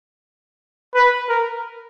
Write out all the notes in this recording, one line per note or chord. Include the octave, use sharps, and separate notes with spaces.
B4
A#4